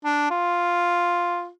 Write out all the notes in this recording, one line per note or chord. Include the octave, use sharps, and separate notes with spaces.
D4
F4